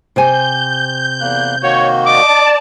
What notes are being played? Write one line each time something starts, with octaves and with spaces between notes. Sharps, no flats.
C3 C5 G#5 G6
E2 A#3 F#6
D#3 A#3 F#4 C#5
D5 D#5 A5 D6